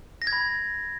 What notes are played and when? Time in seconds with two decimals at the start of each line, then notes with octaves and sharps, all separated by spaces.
0.22 A#6
0.27 G#6
0.33 B5